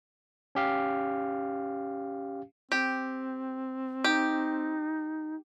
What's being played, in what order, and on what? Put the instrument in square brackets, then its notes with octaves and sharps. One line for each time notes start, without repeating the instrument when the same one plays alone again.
[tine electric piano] C#4 G4 F5
[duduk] C4 [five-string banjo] G4
[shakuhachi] D#4 [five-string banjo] G4